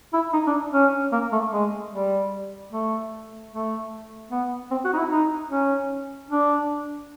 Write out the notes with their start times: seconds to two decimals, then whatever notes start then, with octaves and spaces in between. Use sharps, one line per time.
0.13 E4
0.33 D#4
0.47 D4
0.73 C#4
1.12 A#3
1.32 A3
1.52 G#3
1.92 G3
2.72 A3
3.51 A3
4.31 B3
4.71 C4
4.84 F#4
4.93 D#4
4.98 E4
5.10 D#4
5.50 C#4
6.30 D4